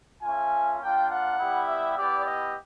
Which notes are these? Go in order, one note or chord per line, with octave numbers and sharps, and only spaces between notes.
A3 C#4 F4 G#5
A#3 D4 F4 G5
F#5
G3 B3 E4 G4
E5
B3 E4 G4 D5
D#5